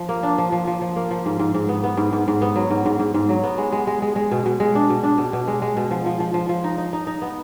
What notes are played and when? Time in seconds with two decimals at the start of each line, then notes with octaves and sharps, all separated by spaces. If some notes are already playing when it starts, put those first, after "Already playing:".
Already playing: F3
0.09 A#3
0.23 D4
0.38 F3
0.52 F3
0.67 F3
0.82 F3
0.96 A#3
1.11 F3
1.26 G#2
1.39 G#2
1.55 G#2
1.69 B3
1.84 B3
1.97 G#2
2.13 G#2
2.28 G#2
2.42 B3
2.56 F#3
2.70 G#2
2.86 G#2
3.00 G#2
3.14 G#2
3.29 F#3
3.43 B3
3.58 G#3
3.72 G#3
3.87 G#3
4.02 G#3
4.16 G#3
4.31 B2
4.46 B2
4.60 G#3
4.75 D4
4.90 B2
5.03 D4
5.18 B2
5.33 B2
5.48 G#3
5.62 G#3
5.77 B2
5.91 F3
6.06 F3
6.20 F3
6.34 F3
6.49 F3
6.64 D#4
6.78 D#4
6.93 D#4
7.07 D#4
7.22 B3